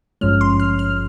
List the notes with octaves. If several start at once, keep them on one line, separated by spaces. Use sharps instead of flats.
G#1 G2 F3 G#3 C#4 F6
C6
F6
F6